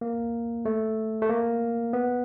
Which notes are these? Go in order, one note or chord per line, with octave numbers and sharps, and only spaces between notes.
A#3
A3
A3
A#3
B3